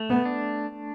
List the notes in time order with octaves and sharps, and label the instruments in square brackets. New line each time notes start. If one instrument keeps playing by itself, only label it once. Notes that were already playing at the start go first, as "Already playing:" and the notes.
Already playing: [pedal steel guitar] A3
[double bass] B3
[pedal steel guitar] D4